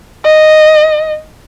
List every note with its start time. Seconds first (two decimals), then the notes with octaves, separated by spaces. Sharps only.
0.24 D#5